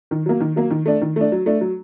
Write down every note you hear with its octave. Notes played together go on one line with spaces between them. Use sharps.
D#3
F#3 A#3
D#3
F#3 A#3
D#3
A3 D4
D#3
A3 D4
F#3
A3 D4
F#3